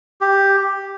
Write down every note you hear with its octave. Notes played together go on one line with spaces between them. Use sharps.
G4